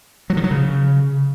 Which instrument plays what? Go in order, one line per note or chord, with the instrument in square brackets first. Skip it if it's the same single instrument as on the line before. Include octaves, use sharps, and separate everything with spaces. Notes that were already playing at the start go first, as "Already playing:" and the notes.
[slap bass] F#3
D#3
F#3
C#3